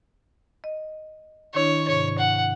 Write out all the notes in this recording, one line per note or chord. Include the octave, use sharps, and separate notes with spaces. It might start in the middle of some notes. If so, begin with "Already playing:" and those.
D#5
D#3 D4 E4 C#5
G#2 C3 C#5
F#5